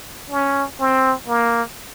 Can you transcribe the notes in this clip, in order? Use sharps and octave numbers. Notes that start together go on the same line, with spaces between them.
C#4
C4
A#3